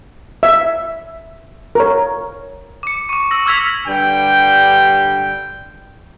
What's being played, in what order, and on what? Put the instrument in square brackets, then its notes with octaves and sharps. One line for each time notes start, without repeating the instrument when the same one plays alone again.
[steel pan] E5
A#4 C#5
[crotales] D6 C#7
C#6 D6
E6 A#6
D6 E6 F6 G#6 B6 F7
[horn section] G2 D3 G3 G5